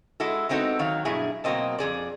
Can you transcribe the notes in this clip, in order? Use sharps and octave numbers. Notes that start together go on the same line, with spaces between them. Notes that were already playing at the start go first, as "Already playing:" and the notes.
G#3 E4 F#4 A4
G#3 B3 C4 D#4 F#4 A4
D#3 F#3 F5
G2 B2 F#3 E4 G#4
B2 F#3 A#3 C4 D#5 A5
F2 F3 G#4 D5